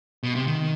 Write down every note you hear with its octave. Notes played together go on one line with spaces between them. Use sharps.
B2
C3
D#3